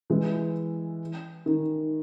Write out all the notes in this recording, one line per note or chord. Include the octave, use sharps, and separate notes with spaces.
E3 G#3
D#3